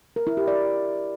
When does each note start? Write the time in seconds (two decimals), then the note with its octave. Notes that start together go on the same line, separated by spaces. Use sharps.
0.16 A#4
0.27 E4
0.37 G4
0.48 D5